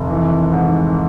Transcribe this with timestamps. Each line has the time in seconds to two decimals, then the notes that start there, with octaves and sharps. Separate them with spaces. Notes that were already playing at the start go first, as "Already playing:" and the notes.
Already playing: F1 D#2
0.10 E3
0.52 G#2